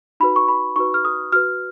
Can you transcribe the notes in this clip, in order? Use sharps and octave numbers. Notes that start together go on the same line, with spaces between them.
D#4 F#4 B4 B5
C#6
B5
D#4 F#4 B4 C#6
F6
D#6
F#4 B4 F6